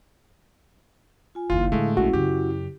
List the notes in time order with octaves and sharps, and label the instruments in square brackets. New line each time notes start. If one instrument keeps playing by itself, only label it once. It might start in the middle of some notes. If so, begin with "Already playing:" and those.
[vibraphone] F4 G#5
[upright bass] F#1 D#2 [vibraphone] E4 F5 [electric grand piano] F4
[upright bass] A2 D3 [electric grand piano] G#3 A3
[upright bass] A#1 [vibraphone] C#4 E4 [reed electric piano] F#4
[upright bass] F#2 C#3 [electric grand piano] G4